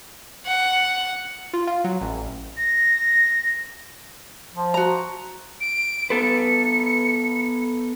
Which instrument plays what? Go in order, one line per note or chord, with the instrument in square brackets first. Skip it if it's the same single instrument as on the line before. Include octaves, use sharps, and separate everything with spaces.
[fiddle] F#5
[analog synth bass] F4
F4
F#3
A1
[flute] A#6
[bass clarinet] F3
[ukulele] F#4 A#5
[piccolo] D7
[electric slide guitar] B3 A4 B4 [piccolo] C#7